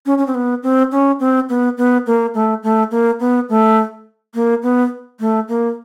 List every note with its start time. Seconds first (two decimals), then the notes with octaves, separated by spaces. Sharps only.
0.06 C#4
0.18 C#4
0.27 C4
0.35 B3
0.63 C4
0.92 C#4
1.20 C4
1.49 B3
1.78 B3
2.07 A#3
2.34 A3
2.63 A3
2.91 A#3
3.20 B3
3.49 A3
4.35 A#3
4.63 B3
5.20 A3
5.49 A#3